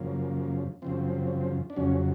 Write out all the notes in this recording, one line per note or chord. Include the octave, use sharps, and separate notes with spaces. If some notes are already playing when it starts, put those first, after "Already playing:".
Already playing: F#2 C#3 F3 A#3
F#2 C#3 F3 C4
D4
F2 C#3 F#3 C#4